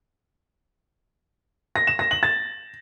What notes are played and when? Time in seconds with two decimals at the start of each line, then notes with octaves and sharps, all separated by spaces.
1.76 A#6
1.87 E7
1.99 A#6
2.11 F#7
2.23 A6